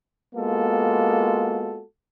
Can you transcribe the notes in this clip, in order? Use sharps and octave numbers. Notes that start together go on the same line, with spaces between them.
G#3 A#3 B3 F4 F#4 A4